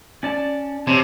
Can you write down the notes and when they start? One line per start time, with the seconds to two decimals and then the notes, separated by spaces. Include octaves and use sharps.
0.23 C#4 D5 A5
0.87 C3 C#5 A5